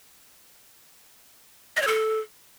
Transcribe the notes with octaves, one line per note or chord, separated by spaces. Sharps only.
D#5
C#5
A4